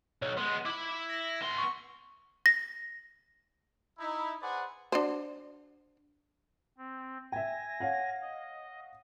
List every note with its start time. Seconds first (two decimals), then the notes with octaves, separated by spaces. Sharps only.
0.22 B1 C#5
0.37 G#3 B3 C6
0.66 E4 B5 D6
1.09 A#6
1.42 B3 C6
1.58 C#6
2.46 A#6
3.98 D#4 E4
4.42 G#4 B4 C5 D5 F#5 G#5
4.92 D4 F#4 C5
6.78 C4
7.32 E5 G5 G#5 A#6
7.80 C#5 F5 F#5
8.22 D#5